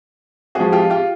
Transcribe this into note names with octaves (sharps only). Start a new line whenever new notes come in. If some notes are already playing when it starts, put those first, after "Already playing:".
F3 G#3 C4 F#4 G#4
F4 G4
F4 G4